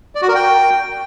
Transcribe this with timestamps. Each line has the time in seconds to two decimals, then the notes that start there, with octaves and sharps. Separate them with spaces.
0.15 D5
0.22 F#4
0.28 A#4
0.35 G5